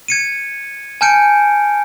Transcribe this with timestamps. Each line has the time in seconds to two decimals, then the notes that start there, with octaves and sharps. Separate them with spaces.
0.08 G#6 C#7 D#7
1.01 G#5 A5 F6 G6 C#7 D7